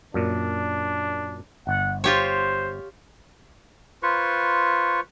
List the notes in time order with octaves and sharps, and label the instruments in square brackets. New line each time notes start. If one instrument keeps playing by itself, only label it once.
[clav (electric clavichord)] F#2 A#2 [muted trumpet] D4
[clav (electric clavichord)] G1 [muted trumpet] F#5
[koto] F4 G4 C#5 [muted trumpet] C5
[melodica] F4 B4 C5 C#6